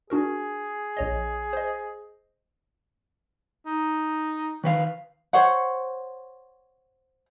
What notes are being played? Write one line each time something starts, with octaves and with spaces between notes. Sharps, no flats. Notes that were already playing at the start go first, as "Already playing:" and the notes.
D4 F#4 G#4 A#4
A#1 C#5 D#5
C5 D#5
D#4
D#3 B4 F5
C5 C#5 F#5